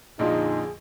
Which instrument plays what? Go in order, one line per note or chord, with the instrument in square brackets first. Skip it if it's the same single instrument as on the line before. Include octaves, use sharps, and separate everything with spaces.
[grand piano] A#1 F2 D3 [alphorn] D#4 [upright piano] F4 D#5 C6 [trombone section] G#4